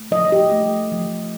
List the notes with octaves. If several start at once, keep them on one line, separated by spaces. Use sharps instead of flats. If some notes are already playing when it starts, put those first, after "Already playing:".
Already playing: A3
F3 D#5
G4
A3
F3